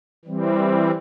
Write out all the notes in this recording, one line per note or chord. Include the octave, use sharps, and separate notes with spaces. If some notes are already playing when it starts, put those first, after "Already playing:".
E3 G3 C4